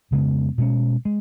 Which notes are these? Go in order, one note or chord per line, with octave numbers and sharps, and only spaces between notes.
F2 C#3 G#3 B3
B2 G#3 C#4
G#3